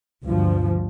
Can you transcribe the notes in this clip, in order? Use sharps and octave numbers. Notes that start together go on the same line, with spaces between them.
D2 G2 B2 F3